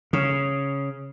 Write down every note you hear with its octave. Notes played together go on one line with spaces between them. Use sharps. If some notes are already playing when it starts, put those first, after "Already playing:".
C#3